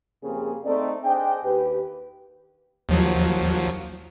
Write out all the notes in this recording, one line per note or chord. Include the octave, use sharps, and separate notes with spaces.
F2 C#3 A#3 C4 G4 G#4
A3 C4 D#4 D5
D4 G#4 C5 D#5 G5
D#2 G4 B4
D#2 F3 F#3